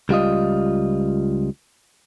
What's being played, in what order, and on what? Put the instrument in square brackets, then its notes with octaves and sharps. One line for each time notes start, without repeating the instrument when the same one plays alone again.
[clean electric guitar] C#2 G3 F4 D#5